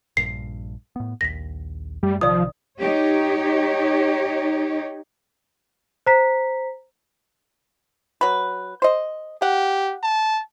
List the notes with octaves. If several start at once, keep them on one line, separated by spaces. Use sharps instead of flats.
A#1 G2 C7
A2 B3
A#1 D#2 A#6 B6
F#2 G3 A3
A#1 C3 D#3 F3 D5 D#6
D#4 G4 C#5
C5 A#5 B6
F#3 B4
C5 D#5
G4 F#5
A5